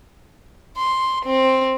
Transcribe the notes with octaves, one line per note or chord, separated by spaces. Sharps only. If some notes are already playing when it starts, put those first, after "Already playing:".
C6
C4